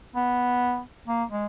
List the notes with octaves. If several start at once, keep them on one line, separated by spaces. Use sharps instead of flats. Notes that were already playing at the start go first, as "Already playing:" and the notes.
B3
A#3
G#3